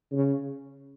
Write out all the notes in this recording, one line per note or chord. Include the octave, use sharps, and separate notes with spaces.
C#3